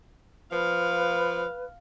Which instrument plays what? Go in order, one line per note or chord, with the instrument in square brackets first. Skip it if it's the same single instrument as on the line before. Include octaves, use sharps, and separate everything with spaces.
[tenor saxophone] F3 [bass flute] B4 [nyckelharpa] F5